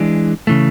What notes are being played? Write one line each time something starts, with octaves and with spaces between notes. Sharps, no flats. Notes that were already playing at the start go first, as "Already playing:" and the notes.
Already playing: E3 G#3 D4
C#3 E3 A3